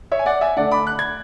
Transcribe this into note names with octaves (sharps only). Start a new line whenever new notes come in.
C#5 E5
G#5
D5 F#5
E5 G#5
D3 A3 D4 D5 F#5
B5 D6
F#6
G#6